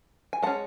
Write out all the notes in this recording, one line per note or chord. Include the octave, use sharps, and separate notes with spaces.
G#5
G#3 C#4 F#5 A5